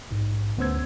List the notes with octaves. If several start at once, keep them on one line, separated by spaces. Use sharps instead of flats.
A#1 G#2
D2 B3 C#4 C5 E6 G#6